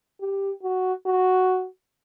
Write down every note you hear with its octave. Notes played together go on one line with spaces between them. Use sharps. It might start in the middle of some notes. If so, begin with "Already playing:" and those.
G4
F#4
F#4